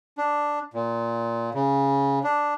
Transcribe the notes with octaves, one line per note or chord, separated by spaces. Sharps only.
D4
A#2
C#3
D4